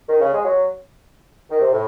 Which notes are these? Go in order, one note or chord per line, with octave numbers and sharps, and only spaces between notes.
D#3
C#3
G#3
F#3
D#3
C3
A2